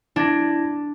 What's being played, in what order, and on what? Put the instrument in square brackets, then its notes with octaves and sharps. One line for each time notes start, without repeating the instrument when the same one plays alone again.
[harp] D4 [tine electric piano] E4 G#6 A#6